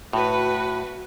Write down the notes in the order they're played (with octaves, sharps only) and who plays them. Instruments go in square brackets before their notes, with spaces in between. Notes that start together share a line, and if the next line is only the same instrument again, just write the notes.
[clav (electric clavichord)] A2 [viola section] F#4 B4